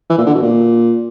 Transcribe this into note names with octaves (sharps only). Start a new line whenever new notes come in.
E3
A#2
D3
B2
A#2